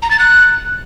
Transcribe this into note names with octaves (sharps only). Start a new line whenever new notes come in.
A#5
A6
F#6